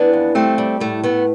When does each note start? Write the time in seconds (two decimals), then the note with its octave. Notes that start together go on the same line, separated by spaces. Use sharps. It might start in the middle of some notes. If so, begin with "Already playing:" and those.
Already playing: E3 B3 D4
0.13 F2
0.35 G3 A3 C4
0.58 G3
0.80 A2 A3
1.03 A3 B3